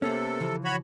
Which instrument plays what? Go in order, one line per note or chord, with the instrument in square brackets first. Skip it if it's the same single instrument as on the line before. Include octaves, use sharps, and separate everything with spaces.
[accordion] C3 A4 [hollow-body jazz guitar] A#3 B3 C#4
[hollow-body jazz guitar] C#3 E3 F3
[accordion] F#4 C#5 B5